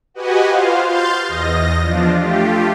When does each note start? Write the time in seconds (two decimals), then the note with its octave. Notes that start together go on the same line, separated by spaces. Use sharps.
0.14 F#4 G4 B4 D#5 F#5 G#5
0.47 F4 C5 F5
0.83 C6 F6 G6 A6
1.27 E2 D#5 A#6
1.82 F3 D4 F4
2.18 A3 F4 G4